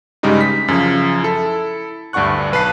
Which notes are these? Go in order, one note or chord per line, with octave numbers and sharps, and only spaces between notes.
G2 C#3 G3 G#3 D#4
B6
F#2 C#3 F3 C#4
E4 A4
D2 G2 D4 F#5 C#6 F#6
B1 B4 A5 C7